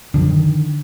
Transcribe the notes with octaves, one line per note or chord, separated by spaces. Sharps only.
F#2 D3 F3 D4
D#3